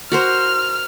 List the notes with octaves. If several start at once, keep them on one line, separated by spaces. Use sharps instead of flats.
F#4 A#4 C5 F6